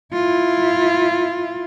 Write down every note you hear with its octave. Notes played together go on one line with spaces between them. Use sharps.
E4 F4